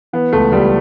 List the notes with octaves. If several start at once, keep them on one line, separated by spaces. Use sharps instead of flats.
E3 B3
C#2 A3
C#2 G3